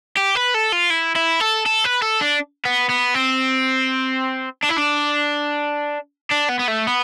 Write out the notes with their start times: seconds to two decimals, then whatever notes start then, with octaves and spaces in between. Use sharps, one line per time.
0.17 G4
0.35 B4
0.54 A4
0.72 F4
0.90 E4
1.16 E4
1.40 A4
1.66 A4
1.84 B4
2.02 A4
2.21 D4
2.65 B3
2.89 B3
3.14 C4
4.64 D4
4.70 E4
4.78 D4
6.32 D4
6.49 B3
6.59 B3
6.68 A3
6.87 B3